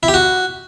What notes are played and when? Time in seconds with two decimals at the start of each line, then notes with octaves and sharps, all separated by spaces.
0.03 E4
0.08 G4
0.14 F#4